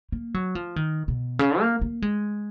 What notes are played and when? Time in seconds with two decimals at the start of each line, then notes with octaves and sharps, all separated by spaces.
0.12 A#3
0.34 F#3
0.55 F3
0.76 D#3
1.08 B2
1.39 C#3
1.60 A#3
1.81 A#3
2.02 G#3